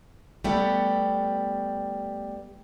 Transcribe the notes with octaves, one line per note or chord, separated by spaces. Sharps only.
G3 A3 B3 G4 E5